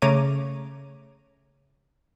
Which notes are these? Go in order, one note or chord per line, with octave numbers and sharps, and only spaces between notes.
C#3 A3 C#5 A#5 D6 D#7